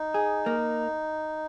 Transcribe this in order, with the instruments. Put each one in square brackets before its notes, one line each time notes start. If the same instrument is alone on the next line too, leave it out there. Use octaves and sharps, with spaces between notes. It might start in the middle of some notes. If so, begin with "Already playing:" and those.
Already playing: [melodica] D#4
[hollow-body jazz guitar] G#4
A#3